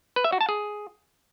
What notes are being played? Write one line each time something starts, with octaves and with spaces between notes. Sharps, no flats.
B4
E5
F#4
A5
G#4